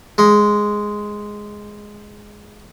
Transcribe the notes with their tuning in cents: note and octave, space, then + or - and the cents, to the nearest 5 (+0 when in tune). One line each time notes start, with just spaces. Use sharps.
G#3 +0